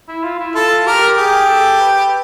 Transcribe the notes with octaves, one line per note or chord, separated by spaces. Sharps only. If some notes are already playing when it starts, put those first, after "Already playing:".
E4
F4
E4
F4 A4
G4 A#4
G4 G#4
A4
B4